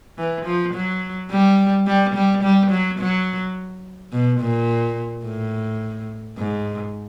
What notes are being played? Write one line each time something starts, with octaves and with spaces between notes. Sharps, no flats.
E3
F3
F#3
G3
G3
G3
G3
F#3
F#3
B2
A#2
A2
G#2